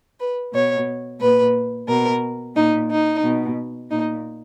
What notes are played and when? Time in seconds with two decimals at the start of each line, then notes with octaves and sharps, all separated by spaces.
0.19 B4
0.54 B2 C#5
1.21 A#2 B4
1.88 B2 A#4
2.55 A#2 D#4
2.90 D#4
3.24 B2
3.91 A#2 D#4